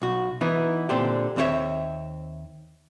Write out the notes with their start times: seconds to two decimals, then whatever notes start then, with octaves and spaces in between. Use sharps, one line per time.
0.02 B1 F#4
0.41 E3 B3 D#4 E4
0.89 A#2 D3 C4 D4 G4
1.36 D#2 C4 D4 E4 C#5 E5